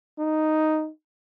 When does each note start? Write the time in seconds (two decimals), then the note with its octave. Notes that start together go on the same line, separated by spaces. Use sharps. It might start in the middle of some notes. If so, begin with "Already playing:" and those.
0.19 D#4